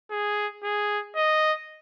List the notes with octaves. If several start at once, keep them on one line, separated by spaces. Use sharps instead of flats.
G#4
G#4
D#5